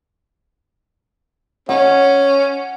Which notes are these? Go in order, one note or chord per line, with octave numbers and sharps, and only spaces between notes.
C#4 F#5